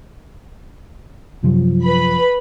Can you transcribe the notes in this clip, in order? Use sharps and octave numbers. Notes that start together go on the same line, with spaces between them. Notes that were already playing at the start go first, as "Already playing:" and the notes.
F#2 C3 F3 F#3
B4 B5